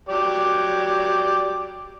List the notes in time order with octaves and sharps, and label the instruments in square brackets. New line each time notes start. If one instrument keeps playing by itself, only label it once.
[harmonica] F#3 G4 D5